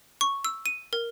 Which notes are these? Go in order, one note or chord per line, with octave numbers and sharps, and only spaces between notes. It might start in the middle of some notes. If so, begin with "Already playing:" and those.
C#6
E6
D#7
A#4